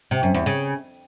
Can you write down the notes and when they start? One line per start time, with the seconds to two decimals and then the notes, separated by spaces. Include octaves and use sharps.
0.11 C3
0.23 F#2
0.34 E2
0.46 C#3